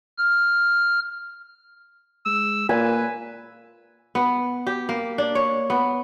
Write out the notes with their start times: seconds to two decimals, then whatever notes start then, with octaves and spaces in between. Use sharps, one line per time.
0.18 F6
2.26 G#3 E6
2.69 A#2 A#3 B4 G#5
4.15 B3
4.67 G4
4.89 A#3
5.18 D4
5.35 C#5
5.70 B3